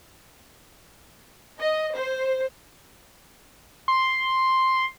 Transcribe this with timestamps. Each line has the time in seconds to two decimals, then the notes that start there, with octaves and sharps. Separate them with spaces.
1.60 D#5
1.95 C5
3.88 C6